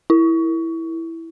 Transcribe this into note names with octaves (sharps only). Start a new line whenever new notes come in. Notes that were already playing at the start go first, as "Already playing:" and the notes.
E4